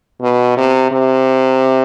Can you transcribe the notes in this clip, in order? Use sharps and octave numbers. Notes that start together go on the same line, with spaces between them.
B2
C3
C3